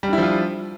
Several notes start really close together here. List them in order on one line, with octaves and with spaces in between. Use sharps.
G3 D4 E4 F3 F4